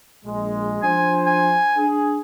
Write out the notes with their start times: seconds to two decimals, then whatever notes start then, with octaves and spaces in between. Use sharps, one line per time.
0.25 A#1 G#3
0.83 F3 D4 C5 G#5
1.27 G#5
1.77 D4 G#4